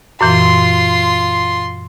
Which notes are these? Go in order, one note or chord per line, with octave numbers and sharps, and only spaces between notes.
F#2 A#2 E3 F4 C6